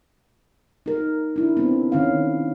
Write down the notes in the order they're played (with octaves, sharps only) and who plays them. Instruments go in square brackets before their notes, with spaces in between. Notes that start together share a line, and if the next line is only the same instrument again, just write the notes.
[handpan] D#4 A#4
D4 E4
B3 C4
D#3 C#4 F5